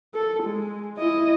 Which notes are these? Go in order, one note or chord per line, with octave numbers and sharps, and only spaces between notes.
A4
G#3
E4 D#5